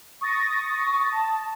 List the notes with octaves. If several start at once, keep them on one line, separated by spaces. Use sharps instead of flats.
C#6 D#6 A6 A#6
A5